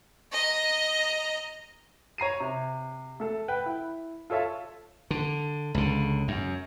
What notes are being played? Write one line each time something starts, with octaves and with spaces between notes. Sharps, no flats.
D#5 A#5
C#5 A#5 C7 D#7
C3
A3 A4
B4 F#5 G5
E4
F4 A4 C#5 E5 A5
D3
C#2 D3
F#2